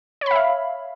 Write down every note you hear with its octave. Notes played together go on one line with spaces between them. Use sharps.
C#5 E5 F5 B5